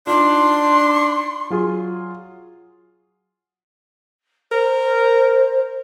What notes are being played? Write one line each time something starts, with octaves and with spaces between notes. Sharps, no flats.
D4 D#4 F4 C6
F#3 F4 G#4
A#4 C5